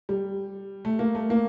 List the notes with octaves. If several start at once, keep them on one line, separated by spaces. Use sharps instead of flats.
G3
A3
A#3
A3
A#3